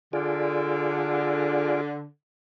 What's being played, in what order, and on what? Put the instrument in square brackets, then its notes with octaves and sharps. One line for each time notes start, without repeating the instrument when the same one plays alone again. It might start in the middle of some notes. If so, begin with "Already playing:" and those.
[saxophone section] D3 [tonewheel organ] F4 G#4 D5